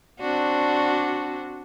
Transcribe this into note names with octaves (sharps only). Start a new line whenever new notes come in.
C4 D4 F#4